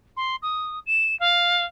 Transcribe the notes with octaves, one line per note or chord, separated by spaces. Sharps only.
C6
D#6
E7
F5